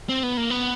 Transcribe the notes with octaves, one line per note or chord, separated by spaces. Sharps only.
C4
B3
A#3
B3